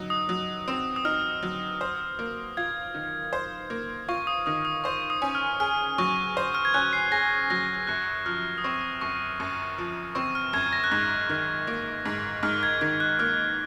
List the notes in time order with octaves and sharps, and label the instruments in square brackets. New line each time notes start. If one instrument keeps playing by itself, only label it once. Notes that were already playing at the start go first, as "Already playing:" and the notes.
Already playing: [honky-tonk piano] F#3 D#4
[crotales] D#6
[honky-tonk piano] F#3
C4
[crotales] D#6
[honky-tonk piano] D#4 [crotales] F6
[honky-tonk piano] F#3
C5
A#3
[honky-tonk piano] F4 [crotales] G#6
[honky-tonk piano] D#3
C5
A#3
[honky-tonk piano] F4 [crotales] C#6
[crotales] D#6
[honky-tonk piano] D#3 [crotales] D#6
[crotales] D#6
[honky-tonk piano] C5 [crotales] C#6
[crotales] D#6
[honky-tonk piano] C#4
[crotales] F6
[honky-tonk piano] G#4 [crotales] F6
[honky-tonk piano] F#3 [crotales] C#6
[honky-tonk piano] C5
[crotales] F6
G#6
[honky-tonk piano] C#4 [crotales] F#6
[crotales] C7
[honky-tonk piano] G#4 [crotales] A#6
[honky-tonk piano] F#3 [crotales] A#6
[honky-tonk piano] F#2 [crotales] F#6
[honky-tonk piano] F3 [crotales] F6
[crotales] D#6
[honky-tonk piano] C4 [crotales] C#6
[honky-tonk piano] F#2 [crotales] C#6
[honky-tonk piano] F#2
F3
[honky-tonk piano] C4 [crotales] C#6
[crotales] F6
[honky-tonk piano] F#2 [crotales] G#6
[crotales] A#6
F#6
[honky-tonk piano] G#2 [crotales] G#6
[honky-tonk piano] D#3
A#3
G#2
[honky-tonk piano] G#2 [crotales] F6
[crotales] G#6
[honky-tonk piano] D#3 [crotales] G#6
[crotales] F#6
[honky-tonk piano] A#3 [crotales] F6